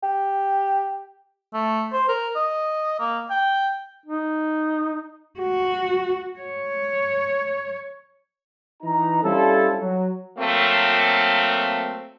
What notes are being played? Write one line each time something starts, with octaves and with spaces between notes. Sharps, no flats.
G4
A3
C5
A#4
D#5
A#3
G5
D#4
F#4
C#5
E3 D#4 A#5
G3 C4 C#4 E4 F4 A4
F#3
F#3 A3 A#3 C4